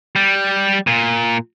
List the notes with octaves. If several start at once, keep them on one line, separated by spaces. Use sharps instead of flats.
G3
A#2